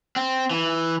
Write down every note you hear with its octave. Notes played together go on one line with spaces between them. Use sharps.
C4
E3